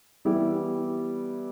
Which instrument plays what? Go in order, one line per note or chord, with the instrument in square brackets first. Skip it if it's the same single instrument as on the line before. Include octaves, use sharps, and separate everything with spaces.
[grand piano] E3 G3 B3 E4 G4